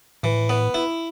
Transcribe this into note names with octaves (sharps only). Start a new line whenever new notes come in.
A2 E3
B3
E4